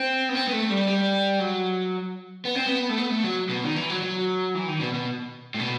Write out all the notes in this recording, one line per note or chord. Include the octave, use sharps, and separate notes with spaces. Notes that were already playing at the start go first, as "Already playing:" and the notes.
Already playing: C4
B3
C4
B3
A3
G3
G3
F#3
B3
C4
B3
A3
B3
A3
F#3
B2
D#3
E3
F#3
F#3
E3
D#3
B2
B2
A2
B2